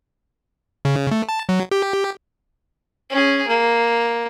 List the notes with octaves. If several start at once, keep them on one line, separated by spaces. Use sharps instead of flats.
C#3
A3
A5
F#3
G4
C#4 G#4
A#3